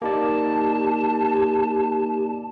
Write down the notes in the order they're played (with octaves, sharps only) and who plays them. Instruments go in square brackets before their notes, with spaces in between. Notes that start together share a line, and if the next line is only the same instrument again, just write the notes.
[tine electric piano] A#3 D#4 D5 [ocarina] G4 [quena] A5